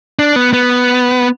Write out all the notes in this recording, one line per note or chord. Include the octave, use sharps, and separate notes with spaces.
D4
B3
B3